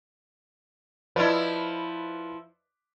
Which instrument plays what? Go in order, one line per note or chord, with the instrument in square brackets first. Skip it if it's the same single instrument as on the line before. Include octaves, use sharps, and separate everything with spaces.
[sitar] F3 E4 [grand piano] B4 D5 D#5